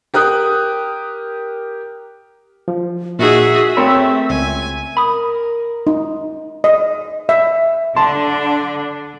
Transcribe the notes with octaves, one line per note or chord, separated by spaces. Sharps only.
G4 A#4 D#6 F#6
F3
A#2 D#4 F#4 G#4 E5
A3 C4 A#4 C#5 B5
C#2 G#5
A#4 B5 D#6
D#4
D#5
E5
D3 D4 A5 C6